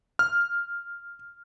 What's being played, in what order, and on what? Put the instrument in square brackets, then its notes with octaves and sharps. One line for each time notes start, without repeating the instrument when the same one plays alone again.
[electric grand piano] F6